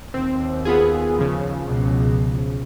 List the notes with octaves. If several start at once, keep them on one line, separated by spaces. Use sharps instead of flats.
D#2 C4
B3 F4 G#4
C#3 F3
C#2 B2